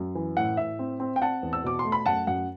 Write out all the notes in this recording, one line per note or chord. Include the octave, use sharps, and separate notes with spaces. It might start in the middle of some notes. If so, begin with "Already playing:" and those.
Already playing: F#2
E3
A2 F#5
A2 E5
C4
C4
G5
C4 F#5 A5
E2
E6
B2 D6
C6
A3
B5
F#2 F#5 A5
F#2 F#5